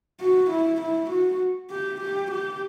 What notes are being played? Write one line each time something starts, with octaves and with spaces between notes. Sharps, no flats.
F#4
E4
E4
F#4
G4
G4
G4